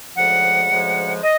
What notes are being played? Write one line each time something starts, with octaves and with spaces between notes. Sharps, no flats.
D2 C#3 F3 G#3 F#5
D2 C#3 F3 G#3
D#5